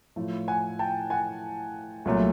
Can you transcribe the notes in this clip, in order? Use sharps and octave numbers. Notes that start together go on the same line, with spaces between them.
A2 F3 A3
F#5 G#5
G5 A5
F#5 G#5
C2 A#2 F#3 A3